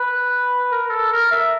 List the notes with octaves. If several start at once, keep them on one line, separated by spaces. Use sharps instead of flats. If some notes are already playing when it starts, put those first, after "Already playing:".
Already playing: B4
A#4
A4
A#4
E5